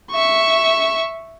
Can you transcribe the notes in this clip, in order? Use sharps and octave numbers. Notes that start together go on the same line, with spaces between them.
E5 C#6